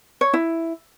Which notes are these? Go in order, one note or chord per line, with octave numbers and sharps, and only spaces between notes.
C#5
E4